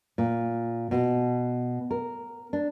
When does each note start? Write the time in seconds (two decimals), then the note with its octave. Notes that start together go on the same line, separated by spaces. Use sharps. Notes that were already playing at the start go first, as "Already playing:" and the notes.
0.18 A#2
0.91 B2
1.91 A#4
2.53 D4